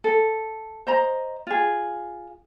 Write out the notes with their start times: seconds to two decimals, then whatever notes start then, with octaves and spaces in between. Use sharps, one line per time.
0.04 A4
0.87 C5 D#5 A#5
1.47 F4 G#4